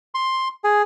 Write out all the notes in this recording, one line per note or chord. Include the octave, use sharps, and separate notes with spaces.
C6
G#4